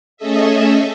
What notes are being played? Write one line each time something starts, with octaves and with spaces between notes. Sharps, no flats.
A3 C#4 G#4 A4 D#5 E5